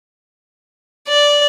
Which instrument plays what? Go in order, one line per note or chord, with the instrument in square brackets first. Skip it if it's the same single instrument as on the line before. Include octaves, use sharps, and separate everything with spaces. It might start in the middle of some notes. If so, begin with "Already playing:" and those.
[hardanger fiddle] D5